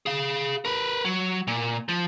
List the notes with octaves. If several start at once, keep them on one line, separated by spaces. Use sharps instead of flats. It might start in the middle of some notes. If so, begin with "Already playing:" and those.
G#4 F5
A#4 B4
F#3
A#2
F3